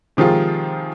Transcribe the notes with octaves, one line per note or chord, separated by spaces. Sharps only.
C3 D#3 F3 G#3 F4